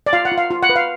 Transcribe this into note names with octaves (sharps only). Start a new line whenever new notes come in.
D5
F4 F5
F#5
F4
F5
F4
F#5
B4
F5